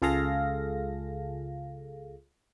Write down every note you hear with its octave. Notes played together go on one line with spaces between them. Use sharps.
C#2 F4 G#4 A4 F5 A#6